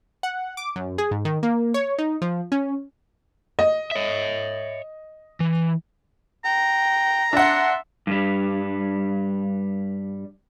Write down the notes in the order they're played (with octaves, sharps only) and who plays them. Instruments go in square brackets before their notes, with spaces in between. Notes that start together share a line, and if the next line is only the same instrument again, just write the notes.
[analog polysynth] F#5
D6
F#2
G#4
G#2
D#3
A#3
C#5
D#4
F3
C#4
[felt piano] D#5
[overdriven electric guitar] C#5 E5
E3
[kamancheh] G5 [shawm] A#5
[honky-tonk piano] D4 F#5 [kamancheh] E5 C6
[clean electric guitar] G2 G3